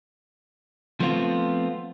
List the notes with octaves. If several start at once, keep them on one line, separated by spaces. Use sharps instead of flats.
F3 A3 B3 C4 F4